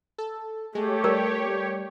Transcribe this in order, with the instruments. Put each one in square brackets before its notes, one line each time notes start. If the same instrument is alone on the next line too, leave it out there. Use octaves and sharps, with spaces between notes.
[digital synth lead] A4
[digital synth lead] G#3 [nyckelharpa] A3 [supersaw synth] G4 C#5
[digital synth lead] G3 [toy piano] A#4